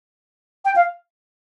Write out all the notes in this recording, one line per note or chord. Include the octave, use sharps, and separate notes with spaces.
G5
F5